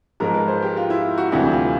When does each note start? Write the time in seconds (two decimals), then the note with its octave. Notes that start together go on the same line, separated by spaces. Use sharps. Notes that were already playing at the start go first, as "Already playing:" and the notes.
0.20 G#2 F3 G#3 A#4
0.34 B4
0.48 C5
0.62 G4
0.77 F4
0.90 E4
1.18 F#4
1.32 D2 C3 E3 G3 G4
1.51 F4